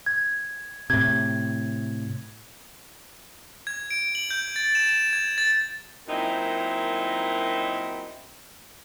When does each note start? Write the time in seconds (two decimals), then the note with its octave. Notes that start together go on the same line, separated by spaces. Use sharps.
0.06 G#6
0.90 A2 C3 G#6
3.67 G#6
3.91 D7
4.15 F#7
4.31 G6
4.56 A6
4.75 E7
4.89 E7
5.13 G#6
5.38 A6
6.08 F#2 A#2 C4 D#4 E4